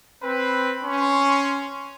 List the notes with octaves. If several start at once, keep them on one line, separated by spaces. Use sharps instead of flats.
C4 B4
C#4 C6